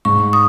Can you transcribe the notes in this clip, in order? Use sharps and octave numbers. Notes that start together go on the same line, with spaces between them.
G#2 C#6
D#6